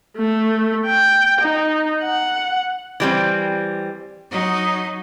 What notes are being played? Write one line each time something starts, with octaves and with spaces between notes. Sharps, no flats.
A3
G5
D#4
F#5
E3 G3 C4
F#3 D#4